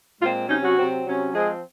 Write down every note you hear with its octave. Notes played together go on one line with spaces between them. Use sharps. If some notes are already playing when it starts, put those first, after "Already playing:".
A#2 G#3 C4 F4
C3 F#3 C#4 D#4
F#3 F#4
C3 F#3 C4
C3 F#3 C#4
F3 G#3 C4 G#4